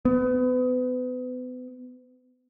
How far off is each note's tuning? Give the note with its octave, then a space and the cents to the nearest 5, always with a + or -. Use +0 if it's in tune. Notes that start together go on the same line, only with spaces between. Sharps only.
B3 +35